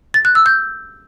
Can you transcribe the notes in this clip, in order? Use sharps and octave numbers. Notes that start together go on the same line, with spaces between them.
A6
F#6
E6
G6